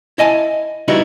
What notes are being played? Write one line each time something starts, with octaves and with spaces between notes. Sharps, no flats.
E4 D#5 G#5 A5
G3 B3 D#4 E4 F#4